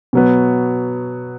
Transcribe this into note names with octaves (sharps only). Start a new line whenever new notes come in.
B2 F#3 B3